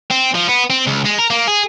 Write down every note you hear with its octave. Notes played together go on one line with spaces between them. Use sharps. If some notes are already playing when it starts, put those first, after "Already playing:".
C4
F3
B3
C4
C#2
G#3
A#4
A#3
G#4